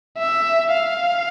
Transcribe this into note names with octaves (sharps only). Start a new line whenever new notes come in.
E5
F5